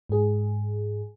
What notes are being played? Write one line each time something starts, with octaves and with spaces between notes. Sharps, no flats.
G#2 G#4